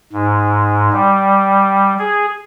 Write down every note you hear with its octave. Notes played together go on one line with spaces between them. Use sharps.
G#2
G3
G#4